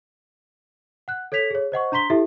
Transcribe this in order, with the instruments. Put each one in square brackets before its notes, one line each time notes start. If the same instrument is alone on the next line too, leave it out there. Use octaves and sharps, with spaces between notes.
[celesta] F#5 F#6
A4 C#5 G#6 B6 F7
G#4 C#5
C5 D#5 F#5 C#6
D4 A#5 C6 B6 G7
E4 G4 A4 E5